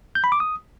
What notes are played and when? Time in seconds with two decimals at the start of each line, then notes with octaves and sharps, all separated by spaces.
0.15 G6
0.24 B5
0.32 D6
0.40 D#6